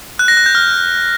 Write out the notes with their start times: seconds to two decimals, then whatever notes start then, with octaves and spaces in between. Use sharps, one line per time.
0.19 F#6
0.28 A#6
0.37 F#6
0.46 G6
0.55 F6